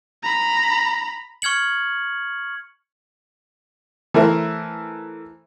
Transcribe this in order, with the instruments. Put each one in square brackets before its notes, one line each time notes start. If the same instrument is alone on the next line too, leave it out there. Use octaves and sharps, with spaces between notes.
[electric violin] A#5 B5
[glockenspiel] C#6 F6 G#6 C#7 F#7
[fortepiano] E3 A3 A#4 C5 E5